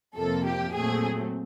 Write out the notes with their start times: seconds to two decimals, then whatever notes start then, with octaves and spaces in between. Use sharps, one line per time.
0.16 F2 C3 F3 A#3 A4
0.46 G4
0.74 A#2 F#3 A3 C4 G#4